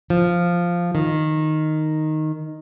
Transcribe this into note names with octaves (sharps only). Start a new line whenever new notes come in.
F3
D#3